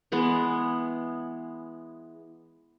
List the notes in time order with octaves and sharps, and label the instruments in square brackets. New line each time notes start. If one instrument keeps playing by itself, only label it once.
[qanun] E3 G#3 B3